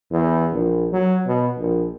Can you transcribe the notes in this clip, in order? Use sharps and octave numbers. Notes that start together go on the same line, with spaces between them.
E2
A#1
F#3
B2
A#1